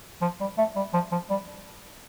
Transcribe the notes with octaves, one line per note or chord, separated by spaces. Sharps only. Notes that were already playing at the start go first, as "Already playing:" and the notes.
F3
G3
A3
G3
F3
F3
G3